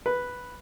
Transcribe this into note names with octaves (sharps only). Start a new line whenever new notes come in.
B4